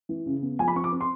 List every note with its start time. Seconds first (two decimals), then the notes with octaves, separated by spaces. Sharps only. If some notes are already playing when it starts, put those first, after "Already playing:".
0.09 E3
0.26 C#3
0.42 B3
0.59 F3 G#5
0.68 B5
0.76 C4 C#6
0.84 D6
0.92 C4
1.01 C6